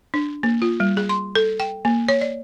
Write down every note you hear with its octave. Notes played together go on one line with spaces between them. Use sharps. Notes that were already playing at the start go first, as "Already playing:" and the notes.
D4
A#3
F4
G3
G#4
C6
A4
G5
A#3
C#5
D5